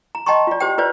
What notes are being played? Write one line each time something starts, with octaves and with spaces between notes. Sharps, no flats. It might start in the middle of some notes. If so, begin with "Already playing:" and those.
A#5
D#5 G5 A5 A#5 C6 C#6
F4 D5
G4 C5 G5
F4 B4 C5 D5